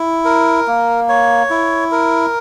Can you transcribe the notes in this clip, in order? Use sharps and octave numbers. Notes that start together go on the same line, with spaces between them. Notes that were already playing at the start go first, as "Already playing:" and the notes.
Already playing: E4
A#4
A#3
C#5
E4
A#4